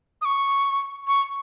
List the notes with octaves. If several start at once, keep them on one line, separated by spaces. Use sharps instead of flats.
D#6
C#6
C#6